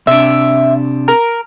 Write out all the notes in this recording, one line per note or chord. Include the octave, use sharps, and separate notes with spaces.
C3 D4 E5
A#4